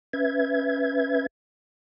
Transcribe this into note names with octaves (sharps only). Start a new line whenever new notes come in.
C#4 B4 E5 G#6